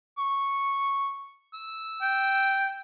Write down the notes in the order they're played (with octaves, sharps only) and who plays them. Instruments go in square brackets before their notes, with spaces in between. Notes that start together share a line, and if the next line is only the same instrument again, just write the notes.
[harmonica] C#6
E6
[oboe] G5